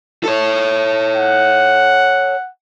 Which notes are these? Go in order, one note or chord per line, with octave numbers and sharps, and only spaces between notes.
A4 C#5
F#5